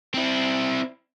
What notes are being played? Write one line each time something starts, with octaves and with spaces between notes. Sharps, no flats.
C4 E4